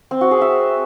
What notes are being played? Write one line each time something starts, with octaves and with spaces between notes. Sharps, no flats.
C4
F#4
G#4
E5